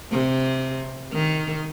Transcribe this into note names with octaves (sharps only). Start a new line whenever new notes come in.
C3
D#3